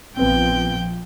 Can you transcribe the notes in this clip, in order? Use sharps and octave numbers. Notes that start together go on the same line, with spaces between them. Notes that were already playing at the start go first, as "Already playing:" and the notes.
A#1 F3 B3 C4 G5